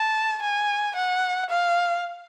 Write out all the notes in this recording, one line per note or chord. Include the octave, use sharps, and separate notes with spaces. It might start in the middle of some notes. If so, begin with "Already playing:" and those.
Already playing: A5
G#5
F#5
F5